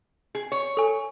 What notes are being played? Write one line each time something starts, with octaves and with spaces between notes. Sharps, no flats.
G#4
C#5
A4 G#5